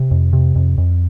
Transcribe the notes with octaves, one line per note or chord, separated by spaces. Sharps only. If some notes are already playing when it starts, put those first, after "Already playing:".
Already playing: C3
F2
C3
F2
F2